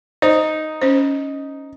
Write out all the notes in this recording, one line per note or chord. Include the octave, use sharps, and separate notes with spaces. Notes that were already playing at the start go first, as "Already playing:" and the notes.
D#4 C5
C#4 C5